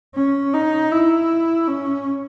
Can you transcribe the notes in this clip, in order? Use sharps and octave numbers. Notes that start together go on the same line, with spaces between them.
C#4
D#4
E4
C#4